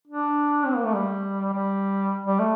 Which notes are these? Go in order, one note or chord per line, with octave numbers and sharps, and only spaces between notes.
D4
C4
A#3
A3
G3
G3
G3
A3